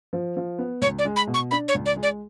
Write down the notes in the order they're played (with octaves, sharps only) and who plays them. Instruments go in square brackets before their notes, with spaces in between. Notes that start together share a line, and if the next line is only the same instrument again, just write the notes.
[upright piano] F3
F3
B3
[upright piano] C#2 [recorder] C#5
[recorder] D5
[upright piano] G#3
[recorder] B5
[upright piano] B2
[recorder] C#6
[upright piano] D4 [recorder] B5
[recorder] C#5
[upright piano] C#2
[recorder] D5
[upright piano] G#3
[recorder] D5